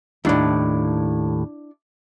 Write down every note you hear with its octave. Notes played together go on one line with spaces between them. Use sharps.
D#2 A2 D4 E4